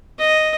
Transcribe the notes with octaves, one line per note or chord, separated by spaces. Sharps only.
D#5